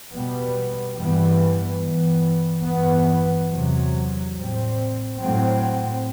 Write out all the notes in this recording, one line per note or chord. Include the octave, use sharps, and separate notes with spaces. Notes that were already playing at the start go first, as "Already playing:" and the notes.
B2 G3 B3
G2 E3 G3 B3
G2 E3 G3 B3
G2 E3 B3
E2 C3 F#3
A2 G3 C4
A2 F#3 C4